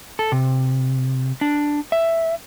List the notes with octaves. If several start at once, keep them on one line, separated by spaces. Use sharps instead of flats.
A4
C3
D4
E5